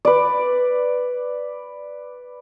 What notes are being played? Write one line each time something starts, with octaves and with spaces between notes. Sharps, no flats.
B4 D5